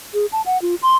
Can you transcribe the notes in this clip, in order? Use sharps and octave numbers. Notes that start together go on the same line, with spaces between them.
G#4
A5
F#5
F4
C6